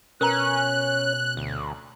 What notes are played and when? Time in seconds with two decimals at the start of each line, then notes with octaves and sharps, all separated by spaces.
0.21 B2 C#4 A#4 B4 A#5 F#6
1.37 D2